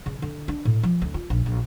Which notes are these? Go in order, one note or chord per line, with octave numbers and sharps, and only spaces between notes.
C#3
D3
D4
A2
F3
D2
F4
A#1
A#1